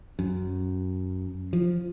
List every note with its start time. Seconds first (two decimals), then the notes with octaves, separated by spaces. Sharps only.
0.19 F#2
1.53 F3